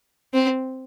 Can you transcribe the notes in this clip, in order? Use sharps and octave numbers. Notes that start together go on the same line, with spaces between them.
C4